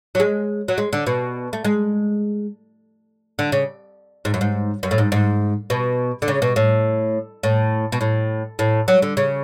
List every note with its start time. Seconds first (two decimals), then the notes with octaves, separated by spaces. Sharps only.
0.15 F#3
0.20 G#3
0.68 F#3
0.78 G#3
0.93 D3
1.07 B2
1.53 A3
1.65 G#3
3.39 D3
3.52 C#3
4.25 G#2
4.34 F#2
4.41 G#2
4.83 F#2
4.91 A2
4.98 G#2
5.12 G#2
5.70 B2
6.22 D3
6.28 C#3
6.42 B2
6.56 A2
7.43 A2
7.92 B2
8.01 A2
8.59 A2
8.88 F#3
9.02 D3
9.17 C#3